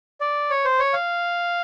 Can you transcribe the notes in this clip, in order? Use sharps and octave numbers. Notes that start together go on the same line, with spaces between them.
D5
C#5
C5
C#5
F5